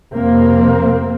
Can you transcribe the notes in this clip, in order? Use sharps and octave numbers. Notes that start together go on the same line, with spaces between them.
F2 C3 A#3 C4